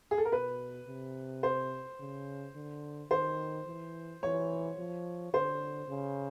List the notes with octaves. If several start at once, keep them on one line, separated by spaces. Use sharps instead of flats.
G#4
A4
A#4
B2 B4
C3
C5
C#3
D3
D#3 C5
E3
E3 C#5
F3
D3 C5
C#3